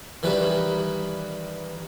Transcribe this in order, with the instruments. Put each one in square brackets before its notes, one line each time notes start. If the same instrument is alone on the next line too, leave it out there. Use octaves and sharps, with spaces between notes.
[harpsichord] D#3 E3 G3 B4